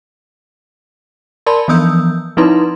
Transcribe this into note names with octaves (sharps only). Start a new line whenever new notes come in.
A#4 D5 A5 B5 C6
E3 F3 B3 D#6 E6 G6
F3 C4 D#4 E4 B4 C6